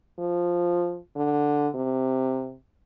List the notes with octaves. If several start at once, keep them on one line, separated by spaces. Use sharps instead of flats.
F3
D3
C3